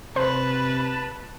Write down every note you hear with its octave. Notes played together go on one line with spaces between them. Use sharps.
C3 B4 C5 A5